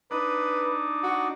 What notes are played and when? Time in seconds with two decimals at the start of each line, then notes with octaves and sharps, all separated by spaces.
0.11 D4 D#4 B4
1.03 F#4